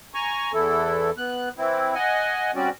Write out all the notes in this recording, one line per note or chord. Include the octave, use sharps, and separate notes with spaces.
G#5 A#5 C#6
E2 E3 E4 A4
B3 F#6
E3 C4 E4
D#5 F#5 G#5
G3 C4 C#4 F#4 D5